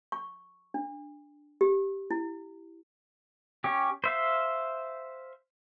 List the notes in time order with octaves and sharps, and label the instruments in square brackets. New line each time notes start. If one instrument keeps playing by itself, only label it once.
[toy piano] C#6
D4
G4
E4
[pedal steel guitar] C#4 G4
C5 E5 F5